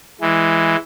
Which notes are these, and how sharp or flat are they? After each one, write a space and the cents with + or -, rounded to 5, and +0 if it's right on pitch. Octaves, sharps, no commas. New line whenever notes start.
E3 +0 G#3 +0